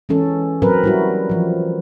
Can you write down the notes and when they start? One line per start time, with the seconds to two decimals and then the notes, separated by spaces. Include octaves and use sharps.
0.09 E3 G#3 C#4 A4
0.62 F#3 C4 A#4 B4
0.84 G3 E4 F#4
1.30 E3 F3